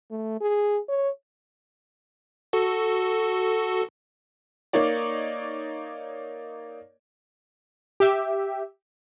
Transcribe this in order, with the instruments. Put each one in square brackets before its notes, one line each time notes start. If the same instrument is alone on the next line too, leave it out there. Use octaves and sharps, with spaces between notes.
[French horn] A3
G#4
C#5
[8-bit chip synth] F#4 A4
[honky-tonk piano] A#3 D#4 C#5 D5
[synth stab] G4 E5